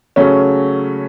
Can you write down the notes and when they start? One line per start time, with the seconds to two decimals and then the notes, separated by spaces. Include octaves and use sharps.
0.16 C#3 F#3 A3 C#4